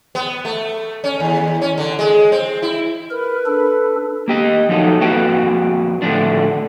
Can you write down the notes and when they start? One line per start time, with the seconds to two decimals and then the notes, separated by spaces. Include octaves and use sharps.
0.15 B3
0.45 A3
1.04 C#4
1.20 D#2
1.62 C#4
1.78 D3
1.99 G#3
2.32 C4
2.62 E4
3.11 A#4 B4
3.46 D4 A4
4.28 A#3 G4 D#5
4.69 F3 F#3 D#4 A4
5.01 F2 A#3 F#4 B4 G5
6.02 A2 D3 F3 D4